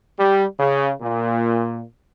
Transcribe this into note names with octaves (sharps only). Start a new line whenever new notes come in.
G3
C#3
A#2